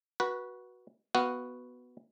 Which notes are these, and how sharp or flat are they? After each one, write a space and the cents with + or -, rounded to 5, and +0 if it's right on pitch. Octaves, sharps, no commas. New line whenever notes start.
F#4 +0 B4 -20
B3 +0 F#4 +0 F5 -5